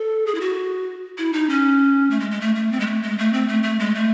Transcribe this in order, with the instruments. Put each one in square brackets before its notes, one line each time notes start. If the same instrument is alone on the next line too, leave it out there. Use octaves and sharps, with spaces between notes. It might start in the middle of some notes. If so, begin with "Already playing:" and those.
Already playing: [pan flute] A4
G#4
E4
F#4
E4
D#4
C#4
A3
G#3
G#3
A3
A3
C4
G#3
A3
G#3
A3
C4
A3
A3
G#3
A3